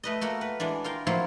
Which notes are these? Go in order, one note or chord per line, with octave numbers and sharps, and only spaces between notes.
A3 B4 D#5
A3 A#3 F#4 A#4
B4
E3 G#3 D4
F4 A#4 G5
F3 F#3 A#3 C4 E4 F4